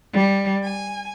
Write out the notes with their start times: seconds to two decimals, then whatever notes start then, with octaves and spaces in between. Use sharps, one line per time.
0.13 G3
0.64 G#5